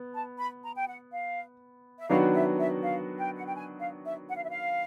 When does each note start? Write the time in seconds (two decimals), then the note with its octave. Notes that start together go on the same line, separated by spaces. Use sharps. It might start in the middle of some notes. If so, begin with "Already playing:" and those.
Already playing: B3
0.15 A5
0.39 B5
0.64 A#5
0.76 G5
0.88 F#5
1.13 F5
1.99 E5
2.10 D#3 F#3 B3 D4 F#4 F5
2.34 E5
2.58 E5
2.83 F5
3.20 G5
3.36 F#5
3.46 G5
3.56 G#5
3.81 F5
4.05 E5
4.29 F#5
4.36 F5
4.44 E5
4.51 F5